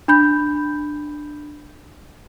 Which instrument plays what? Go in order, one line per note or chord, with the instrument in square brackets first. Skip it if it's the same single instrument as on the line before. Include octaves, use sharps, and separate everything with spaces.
[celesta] D4 B5 G6